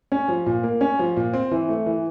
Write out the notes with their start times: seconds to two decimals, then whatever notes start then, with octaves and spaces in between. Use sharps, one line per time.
0.12 C#4
0.28 F3
0.46 A#2
0.64 A#3
0.81 C#4
0.99 F3
1.16 A#2
1.34 C4
1.51 E3
1.69 A3
1.86 E3